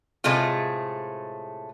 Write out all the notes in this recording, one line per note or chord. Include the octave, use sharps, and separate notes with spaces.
A2 C3 G#3 A3 F4